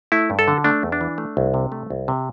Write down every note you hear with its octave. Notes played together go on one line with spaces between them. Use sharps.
A3 E4
G2
A4
D3
A3 D4
E2
D4
E3
A3
C2
C3
A3
C2
C3